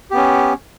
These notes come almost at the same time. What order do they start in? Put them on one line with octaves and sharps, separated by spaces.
G4 B3 C#4